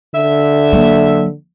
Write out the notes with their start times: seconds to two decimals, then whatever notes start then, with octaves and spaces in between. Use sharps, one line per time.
0.15 D3 E5
0.73 F#3 A#3